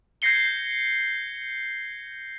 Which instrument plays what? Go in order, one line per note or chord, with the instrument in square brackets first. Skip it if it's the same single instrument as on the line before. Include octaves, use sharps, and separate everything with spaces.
[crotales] G6 G#6 A#6 C7 C#7 G7